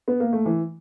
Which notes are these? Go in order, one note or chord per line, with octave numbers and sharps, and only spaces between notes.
B3
A#3
A3
E3